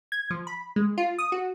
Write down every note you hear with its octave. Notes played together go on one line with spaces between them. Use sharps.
G#6
F3
B5
G#3
F4
D#6
F#4